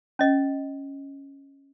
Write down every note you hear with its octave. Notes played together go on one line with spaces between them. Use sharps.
C#4 D#5